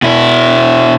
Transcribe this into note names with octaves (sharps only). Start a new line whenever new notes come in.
B2 E4